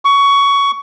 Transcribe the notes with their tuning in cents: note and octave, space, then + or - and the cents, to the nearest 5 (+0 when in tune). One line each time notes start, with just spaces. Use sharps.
C#6 +15